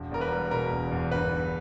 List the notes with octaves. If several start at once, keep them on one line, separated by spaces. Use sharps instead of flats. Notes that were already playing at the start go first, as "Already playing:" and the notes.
Already playing: E1
E2 A#4
B4
G3
B2 A#4
E1
E2
G1 B4
G2